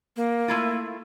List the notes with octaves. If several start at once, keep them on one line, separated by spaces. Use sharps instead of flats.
A#3
A3 E4 F4